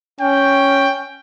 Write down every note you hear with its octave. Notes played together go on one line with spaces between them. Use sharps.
C#4 G5